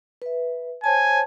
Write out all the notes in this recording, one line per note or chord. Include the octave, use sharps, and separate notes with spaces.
B4 E5
C5 C#5 G#5 A5